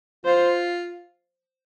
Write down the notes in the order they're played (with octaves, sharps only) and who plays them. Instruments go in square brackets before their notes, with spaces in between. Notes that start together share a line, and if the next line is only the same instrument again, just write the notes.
[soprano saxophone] F4 [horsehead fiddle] C5